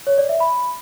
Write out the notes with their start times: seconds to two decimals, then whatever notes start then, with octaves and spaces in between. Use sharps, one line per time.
0.07 C#5
0.18 D5
0.29 E5
0.40 B5